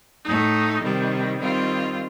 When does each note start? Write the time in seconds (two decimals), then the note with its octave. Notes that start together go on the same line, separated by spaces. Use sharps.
0.25 A2 A3 D#4
0.82 C3 D#3 G3
1.39 D#3 G3 C4 F4